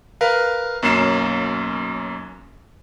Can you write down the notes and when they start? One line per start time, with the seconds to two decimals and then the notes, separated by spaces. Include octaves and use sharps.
0.21 A#4 B4 F5
0.82 B1 F#2 A#3 C#4 C7 E7